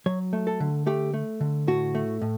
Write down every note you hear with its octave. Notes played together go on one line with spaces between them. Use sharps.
F#3 C#5
A3
A4
D3
A3 G4
A3
D3
A2 F#4
A3
A2